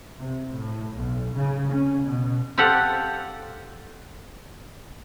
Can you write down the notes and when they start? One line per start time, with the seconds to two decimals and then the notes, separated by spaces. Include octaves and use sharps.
0.16 C3
0.54 A2
0.95 B1
1.36 C#3
1.73 C#4
2.05 B2
2.58 F4 G4 A4 F5 F#5